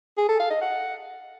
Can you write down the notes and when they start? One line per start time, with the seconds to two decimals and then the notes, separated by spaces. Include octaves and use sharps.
0.18 G#4
0.29 A4
0.39 F5
0.50 D#5
0.61 F#5